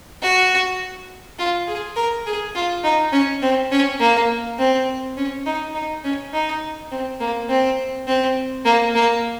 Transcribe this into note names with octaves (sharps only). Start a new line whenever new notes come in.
F#4
F4
G#4
A#4
G#4
F4
D#4
C#4
C4
C#4
A#3
C4
C#4
D#4
D#4
C#4
D#4
C4
A#3
C4
C4
A#3
A#3